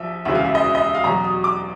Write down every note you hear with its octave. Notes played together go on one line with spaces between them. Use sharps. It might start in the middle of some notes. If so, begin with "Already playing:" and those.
Already playing: A#1 F3 E5
E1 D2 C#3 E3 E5
F5
E5
D#5
E5
D#5
E5
F5
E2 B2 F#3 A#5
D#6
D6